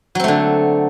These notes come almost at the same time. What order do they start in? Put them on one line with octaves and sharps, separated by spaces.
F#3 C4 A3 D3